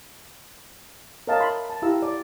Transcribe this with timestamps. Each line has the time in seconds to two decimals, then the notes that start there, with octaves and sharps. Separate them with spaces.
1.27 A#4 C#5 D#5 F5 A5 A#5
1.40 A#4 E5 B5 C6
1.70 A5
1.82 E4 G4 F5 A#5 E6
2.02 D5